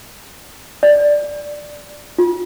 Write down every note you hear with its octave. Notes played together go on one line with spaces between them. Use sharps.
D5
F4